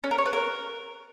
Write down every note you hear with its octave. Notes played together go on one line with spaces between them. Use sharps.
C#4
A#4
C#5
B4
A#4